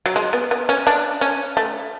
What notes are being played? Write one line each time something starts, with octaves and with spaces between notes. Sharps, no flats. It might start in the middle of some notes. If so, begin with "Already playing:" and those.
F#3
G#3
B3
B3
C#4
D4
C#4
A3